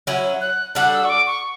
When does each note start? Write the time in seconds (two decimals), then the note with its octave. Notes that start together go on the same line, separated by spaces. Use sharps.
0.07 F#3 C#4 E4
0.41 F#6
0.75 G3 D4 F#4 A4 F#6
0.93 E6
1.04 C#6
1.10 D6
1.27 C#6